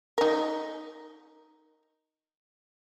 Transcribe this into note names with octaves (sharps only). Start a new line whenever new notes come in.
D#4 A#4